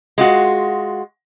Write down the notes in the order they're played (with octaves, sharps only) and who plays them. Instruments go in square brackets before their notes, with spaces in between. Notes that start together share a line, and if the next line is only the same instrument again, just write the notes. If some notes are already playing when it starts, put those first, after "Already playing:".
[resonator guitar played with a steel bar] G#3 F4 F#4